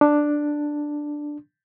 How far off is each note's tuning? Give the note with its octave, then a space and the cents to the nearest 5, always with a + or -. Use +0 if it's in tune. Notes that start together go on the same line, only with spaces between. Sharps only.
D4 +5